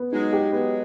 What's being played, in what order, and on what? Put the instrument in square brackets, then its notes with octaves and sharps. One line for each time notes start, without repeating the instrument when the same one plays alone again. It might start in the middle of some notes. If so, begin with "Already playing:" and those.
Already playing: [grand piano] B3
[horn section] F#3 G#3 [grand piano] D#4
[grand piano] G4
[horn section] F#3 G#3 [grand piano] B3